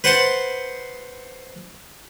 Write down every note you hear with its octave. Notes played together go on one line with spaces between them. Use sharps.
B4 C5 F#5 A5 C6